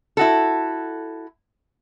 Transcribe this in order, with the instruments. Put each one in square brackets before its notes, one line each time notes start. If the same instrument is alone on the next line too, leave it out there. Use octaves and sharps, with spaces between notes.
[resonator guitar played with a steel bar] E4 F#4 A4